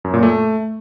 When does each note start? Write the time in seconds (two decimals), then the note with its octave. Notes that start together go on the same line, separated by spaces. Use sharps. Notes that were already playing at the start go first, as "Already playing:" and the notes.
0.04 F#2
0.14 A#2
0.23 A3